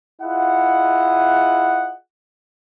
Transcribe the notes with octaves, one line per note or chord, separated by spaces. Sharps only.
E4 F4 G#4 D#5 F#5